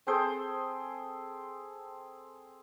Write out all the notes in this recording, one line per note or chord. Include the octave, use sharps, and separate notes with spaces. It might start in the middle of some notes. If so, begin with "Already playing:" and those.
C4 G#4 A4 C5